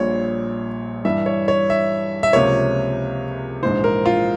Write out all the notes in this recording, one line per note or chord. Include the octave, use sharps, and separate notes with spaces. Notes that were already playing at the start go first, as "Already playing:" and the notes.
Already playing: A#1 A#2 G3 C#5
G2 E3 G3 E5
C#5
C#5
E5
E5
C#2 C3 F3 A#3 C#5
A#1 G#2 E3 C5
A#4
F4